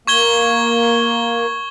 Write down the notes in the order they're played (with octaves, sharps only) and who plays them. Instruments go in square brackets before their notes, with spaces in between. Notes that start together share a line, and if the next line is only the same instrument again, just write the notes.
[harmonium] A#3 [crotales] C#6 G#6 G7